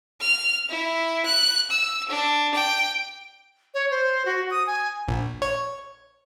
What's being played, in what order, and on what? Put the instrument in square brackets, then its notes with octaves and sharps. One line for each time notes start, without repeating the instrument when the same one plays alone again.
[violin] F6
E4
F#6
E6
D4
G5
[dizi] C#5
C5
F#4
D#6
G#5
[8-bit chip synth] A#1
C#5